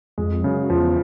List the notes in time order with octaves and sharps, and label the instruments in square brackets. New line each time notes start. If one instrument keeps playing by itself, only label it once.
[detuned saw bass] F2 [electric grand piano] G#3
[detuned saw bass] F#2 [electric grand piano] C#3
[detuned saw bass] E2 [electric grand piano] F3